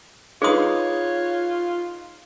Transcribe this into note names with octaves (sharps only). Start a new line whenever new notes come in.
D#4 F4 G#4 B4 C#5 F5 D#6